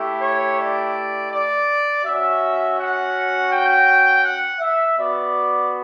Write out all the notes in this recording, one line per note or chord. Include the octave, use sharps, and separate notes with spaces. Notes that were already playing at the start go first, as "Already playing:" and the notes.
Already playing: A3 E4 G4
C#5
D5
D5
C#4 F#4 E5
F#5
G5
F#5
E5
B3 F#4 D5